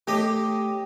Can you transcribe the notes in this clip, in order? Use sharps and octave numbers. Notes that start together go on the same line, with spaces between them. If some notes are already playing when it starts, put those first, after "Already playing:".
A2 G4 D#5